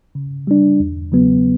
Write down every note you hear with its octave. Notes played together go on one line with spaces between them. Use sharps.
C#3
G3 D4
E2
C#3 F#3 B3